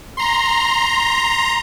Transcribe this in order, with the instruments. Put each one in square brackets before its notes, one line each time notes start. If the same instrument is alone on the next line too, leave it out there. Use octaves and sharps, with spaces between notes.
[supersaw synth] A#5 C6